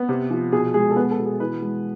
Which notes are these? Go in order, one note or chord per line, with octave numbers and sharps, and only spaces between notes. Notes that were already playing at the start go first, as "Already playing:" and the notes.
Already playing: B3
C3
F3
B2 G#4
G#3 G#4
A4
B3 B4
A4
B2
G#4
E3 B4
G#3